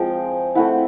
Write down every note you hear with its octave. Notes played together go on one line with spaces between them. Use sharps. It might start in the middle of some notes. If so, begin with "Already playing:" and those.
Already playing: F3 G#3 C4 G5
A3 C4 E4 F#5